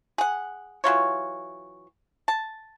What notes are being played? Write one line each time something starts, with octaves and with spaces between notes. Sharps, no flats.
G#4 F#5
E3 F#3 F4 C#5
A5